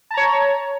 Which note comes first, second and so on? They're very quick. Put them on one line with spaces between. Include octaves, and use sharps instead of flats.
A5 A#5 C#5